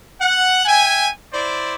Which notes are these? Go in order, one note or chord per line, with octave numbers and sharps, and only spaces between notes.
F#5
E5 G5 G#5
E4 C5 D5